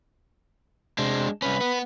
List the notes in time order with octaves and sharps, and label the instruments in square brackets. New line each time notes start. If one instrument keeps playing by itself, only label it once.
[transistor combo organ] C3 [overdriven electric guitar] G#3 D4
[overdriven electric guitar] C2 C#4 [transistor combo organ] B4
[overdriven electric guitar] B3